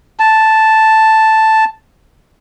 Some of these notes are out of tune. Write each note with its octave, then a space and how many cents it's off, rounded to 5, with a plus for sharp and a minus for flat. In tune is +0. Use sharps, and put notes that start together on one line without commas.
A5 +0